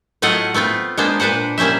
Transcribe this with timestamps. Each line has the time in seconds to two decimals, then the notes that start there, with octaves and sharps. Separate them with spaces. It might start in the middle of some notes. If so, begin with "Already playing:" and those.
0.22 A2 F#3 A3 F4 D#5 F#5
0.54 A3 B3 C4 F4
0.97 G#3 A#3 B3 D4 C5
1.20 A#2 D4 B4 C5 F#5
1.58 G3 A#3 C#4 C5 E5